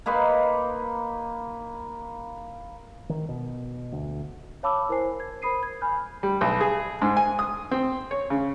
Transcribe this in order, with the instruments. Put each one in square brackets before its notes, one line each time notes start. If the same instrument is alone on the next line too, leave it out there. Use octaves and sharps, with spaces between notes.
[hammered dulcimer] A#3 D#4 B4 C6
[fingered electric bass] D#3
B2
D2
[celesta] C#5 F5 A5 B5 D6 E6
E4 A#4 C5 G#5 C7
G#6
A#4 C5 B5 D#6 C7 D#7
G#6
G#5 B5 F6 G6
[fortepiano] G3
B1
G#4
G#2
G#5
D#6
C4
C#5
C#3